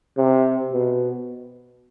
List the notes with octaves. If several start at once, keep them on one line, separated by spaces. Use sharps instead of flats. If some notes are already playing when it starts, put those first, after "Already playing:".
C3
B2